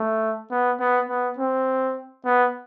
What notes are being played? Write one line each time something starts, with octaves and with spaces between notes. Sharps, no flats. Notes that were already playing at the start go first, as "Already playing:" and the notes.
Already playing: A3
B3
B3
B3
C4
B3